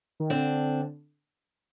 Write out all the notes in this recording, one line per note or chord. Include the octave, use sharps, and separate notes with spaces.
D#3
D3 C4 D4